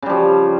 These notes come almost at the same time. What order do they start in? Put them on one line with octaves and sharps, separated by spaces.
C#3 G3 F3